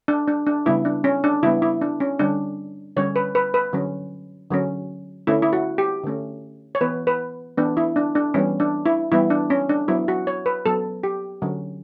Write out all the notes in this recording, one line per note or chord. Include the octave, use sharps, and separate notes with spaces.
D4
D4
D4
C#3 G3 B3 E4
D4
C#4
D4
C#3 G3 B3 E4
E4
D4
C#4
D3 G3 C#4 D4
D3 G3 C#4 C#5
B4
B4
B4
D3 F#3 C#4
D3 F#3 C#4
D3 A3 C#4 E4
E4
F#4
G4
D3 A3 C#4
C#5
E3 B3 B4
B4
E3 B3 D4
E4
D4
D4
E3 G3 B3 C#4
D4
E4
E3 G3 B3 E4
D4
C#4
D4
F#3 B3 E4
F#4
C#5
B4
F#3 B3 A4
G4
D3 F#3 C#4